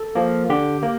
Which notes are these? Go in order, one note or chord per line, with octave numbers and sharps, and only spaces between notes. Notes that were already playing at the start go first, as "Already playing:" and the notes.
Already playing: A4
F3 A#3
D3 G4
A#3